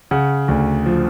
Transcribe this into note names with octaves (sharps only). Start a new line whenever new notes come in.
C#3 F#5
D2
F3